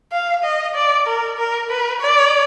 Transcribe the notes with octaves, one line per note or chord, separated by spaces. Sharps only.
F5
D#5
D5
A#4
A#4
B4
D5